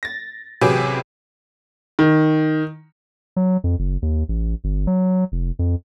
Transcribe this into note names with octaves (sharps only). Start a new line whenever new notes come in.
A6 A#6
A1 C3 F#3 G4 G#4 B4
D#3
F#3
F2
F#1
D#2
A1
G1
F#3
F1
F2